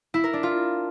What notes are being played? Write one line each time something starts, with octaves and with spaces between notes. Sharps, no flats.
E4
A#4
D4
F4